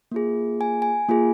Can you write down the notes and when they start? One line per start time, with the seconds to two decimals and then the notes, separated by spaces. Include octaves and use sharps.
0.12 A#3 F4 G#4
0.61 G#5
0.82 G#5
1.09 A#3 F4 G#4